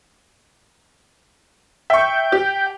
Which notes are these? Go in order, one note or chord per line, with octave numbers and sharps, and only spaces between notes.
E5 G5 C#6
G4